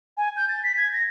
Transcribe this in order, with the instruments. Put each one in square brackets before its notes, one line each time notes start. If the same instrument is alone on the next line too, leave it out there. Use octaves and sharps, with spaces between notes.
[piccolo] G#5
G6
A6
B6
G#6
A#6